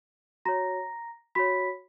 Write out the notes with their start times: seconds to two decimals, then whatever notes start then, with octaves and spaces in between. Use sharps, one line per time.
0.45 F#4 C#5 A#5 A#6
1.35 F#4 C#5 B5 B6